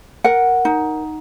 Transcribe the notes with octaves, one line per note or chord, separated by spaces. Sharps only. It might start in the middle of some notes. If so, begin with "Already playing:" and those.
A#4 F#5
D#4